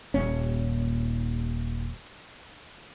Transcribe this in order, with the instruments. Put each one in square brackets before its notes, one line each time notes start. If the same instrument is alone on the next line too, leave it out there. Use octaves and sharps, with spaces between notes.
[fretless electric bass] D#1 C#4